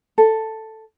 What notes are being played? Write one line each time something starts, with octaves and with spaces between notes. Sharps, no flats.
A4